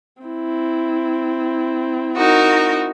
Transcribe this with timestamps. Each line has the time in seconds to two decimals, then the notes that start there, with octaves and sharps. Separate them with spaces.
0.22 C4 E4
2.17 D#4 F#4 A#4